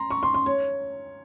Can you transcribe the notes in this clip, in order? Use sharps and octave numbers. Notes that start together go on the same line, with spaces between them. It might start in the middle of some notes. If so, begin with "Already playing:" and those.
Already playing: A#5 C6
C#6
C6
C6
C#5